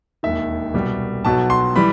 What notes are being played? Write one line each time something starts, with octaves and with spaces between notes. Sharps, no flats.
E1 D#2 D#3 E5
C2 B2 G3
B1 B2 F#3 A5
C6
E3 G3 B5